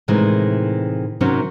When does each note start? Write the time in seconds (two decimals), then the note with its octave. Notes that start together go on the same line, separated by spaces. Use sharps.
0.08 A2 C3 D#3 E3 G#3
1.21 C3 D#3 F#3 C4 C#4